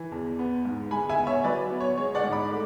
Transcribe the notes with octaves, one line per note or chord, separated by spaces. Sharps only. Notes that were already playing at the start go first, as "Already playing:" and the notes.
Already playing: E3
E2
B3
G#2
G#3 G#5 B5
E5 G#5
B3
C#5 E5
F#3 B4 D5
B3
C#5
G#3 C#5
D5 F#5
G#2
B5 D6
A3